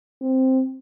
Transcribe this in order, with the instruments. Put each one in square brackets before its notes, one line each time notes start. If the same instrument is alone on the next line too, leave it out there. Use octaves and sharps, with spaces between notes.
[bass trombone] C4